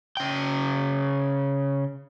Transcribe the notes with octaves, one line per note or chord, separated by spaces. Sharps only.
C#3 G5